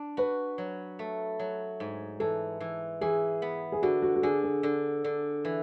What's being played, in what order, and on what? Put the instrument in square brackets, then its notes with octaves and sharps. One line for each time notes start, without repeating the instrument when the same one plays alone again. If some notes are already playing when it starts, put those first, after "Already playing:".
Already playing: [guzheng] D4
[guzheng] F#4 [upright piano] B4
[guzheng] F#3
A3
F#3
G#2
[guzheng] E3 [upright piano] A4
[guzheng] E3
[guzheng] E3 [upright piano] G#4
[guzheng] B3
[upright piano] G#4
[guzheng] D3 [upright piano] F#4
[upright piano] F#4
F#4
[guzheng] D3 [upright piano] G#4
[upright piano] G#4
[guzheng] D3
D3
E3